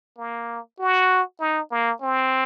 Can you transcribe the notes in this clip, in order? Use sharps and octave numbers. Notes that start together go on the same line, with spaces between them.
A#3
F#4
D#4
A#3
C4